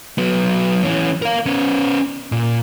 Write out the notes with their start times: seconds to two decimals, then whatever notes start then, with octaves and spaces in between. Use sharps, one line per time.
0.18 F#3 B3
0.84 E3 C#4
1.22 A#4 F5
1.46 B3 C#4
2.32 A#2